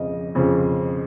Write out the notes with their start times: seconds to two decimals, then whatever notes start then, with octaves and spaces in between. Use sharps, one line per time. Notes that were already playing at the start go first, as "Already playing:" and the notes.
Already playing: F2 C#3 F3 D#5
0.35 F2 C#3 F3